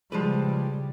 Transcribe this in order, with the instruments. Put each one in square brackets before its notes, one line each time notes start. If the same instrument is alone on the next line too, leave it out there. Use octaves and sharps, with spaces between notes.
[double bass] C#3 G3 [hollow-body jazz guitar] F3 G#3 B4